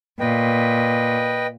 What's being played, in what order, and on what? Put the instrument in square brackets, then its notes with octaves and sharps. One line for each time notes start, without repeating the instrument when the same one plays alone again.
[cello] A#2 [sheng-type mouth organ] B4 D#5 G5